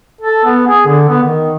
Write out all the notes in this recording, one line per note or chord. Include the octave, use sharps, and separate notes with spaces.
A4
B3
G#4
D3
B3
D#3